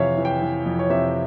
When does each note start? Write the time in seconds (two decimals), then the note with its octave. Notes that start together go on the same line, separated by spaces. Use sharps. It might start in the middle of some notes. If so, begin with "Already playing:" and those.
Already playing: F2 C3 E3 C#5 E5 F5
0.17 E3
0.25 G5
0.42 E3
0.65 F2
0.79 C#5
0.90 C3 E5